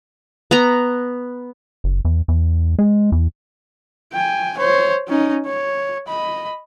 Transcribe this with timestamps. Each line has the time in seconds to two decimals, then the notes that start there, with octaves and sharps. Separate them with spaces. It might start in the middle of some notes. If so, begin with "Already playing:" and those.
0.51 B3 A#5
1.84 F#1
2.05 E2
2.28 E2
2.79 G#3
3.12 E2
4.13 G5 G#5
4.58 C5 C#5
5.08 C#4 D#4
5.46 C#5
6.08 D#5 B5